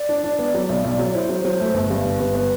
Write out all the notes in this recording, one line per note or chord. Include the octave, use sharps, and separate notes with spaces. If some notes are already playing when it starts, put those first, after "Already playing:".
Already playing: D5
D4
D4
B3
F#3
B1
B1
F#3
E4 C5
F#3
F#3 C5
A3
G1 B4
G2
G1
G2
B3